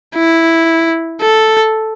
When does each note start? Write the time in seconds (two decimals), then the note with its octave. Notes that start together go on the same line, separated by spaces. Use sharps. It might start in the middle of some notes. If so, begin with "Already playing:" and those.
0.15 E4
1.22 A4